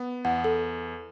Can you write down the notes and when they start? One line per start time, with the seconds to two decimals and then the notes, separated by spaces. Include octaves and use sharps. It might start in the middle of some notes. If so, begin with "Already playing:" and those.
Already playing: B3
0.25 E2 F#5
0.44 A4